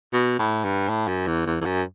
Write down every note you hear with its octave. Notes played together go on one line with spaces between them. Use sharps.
B2
A2
G2
A2
F#2
E2
E2
E2
F#2